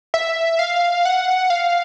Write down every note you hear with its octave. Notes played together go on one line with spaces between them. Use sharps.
E5
F5
F#5
F5